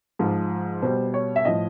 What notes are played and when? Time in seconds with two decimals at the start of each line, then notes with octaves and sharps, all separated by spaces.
0.19 G#2 F3
0.82 B2 G3 C5
1.14 C#5
1.36 E5
1.45 A2 F3 D#5